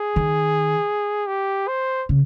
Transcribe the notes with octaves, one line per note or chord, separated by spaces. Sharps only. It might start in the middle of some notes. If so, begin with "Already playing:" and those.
Already playing: G#4
D#3
G4
C5
C#3